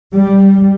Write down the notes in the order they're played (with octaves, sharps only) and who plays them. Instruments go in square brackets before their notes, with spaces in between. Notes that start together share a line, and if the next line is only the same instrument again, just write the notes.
[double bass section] G3